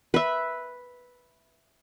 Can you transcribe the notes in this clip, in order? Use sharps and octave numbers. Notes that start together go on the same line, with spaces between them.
B4 E5